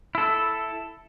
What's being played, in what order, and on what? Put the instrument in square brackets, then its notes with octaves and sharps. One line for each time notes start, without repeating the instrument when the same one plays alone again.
[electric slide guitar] E4 A4